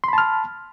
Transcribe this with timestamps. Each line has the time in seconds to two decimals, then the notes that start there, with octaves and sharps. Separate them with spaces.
0.04 C6
0.08 B5
0.13 A5
0.18 F6